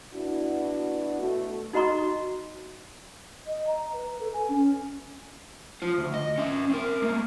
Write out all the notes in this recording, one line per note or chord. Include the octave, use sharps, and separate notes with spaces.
B3 D4 E4 F#4
B2 A3 F#4
D#4 F#4 D#5 A#5 C6 C#6
D#5
A#5
B4
A4
G#5
C#4
F4 C5
D2
D#5
C#4 E5
C4 A#4
A3 A#3